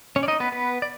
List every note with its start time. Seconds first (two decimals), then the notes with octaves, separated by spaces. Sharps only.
0.16 C#4 C#5
0.23 D5
0.28 D#4 D#5
0.40 B3 B4
0.52 B3 B4
0.82 D5